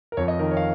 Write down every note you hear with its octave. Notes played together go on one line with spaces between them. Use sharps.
A#4
F2 C#5
D#5
D#3 A#4
C#5
F5